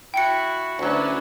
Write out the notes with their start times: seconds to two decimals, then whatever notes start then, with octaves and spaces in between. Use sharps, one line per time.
0.14 E4 F#4 G5 C#7
0.79 D2 F#3 C#4 D4 E4 F#4 B4